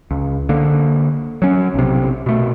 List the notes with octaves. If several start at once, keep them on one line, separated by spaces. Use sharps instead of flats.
C#2
D3 A#3
F#3 C#4
B1 C3
B2 A3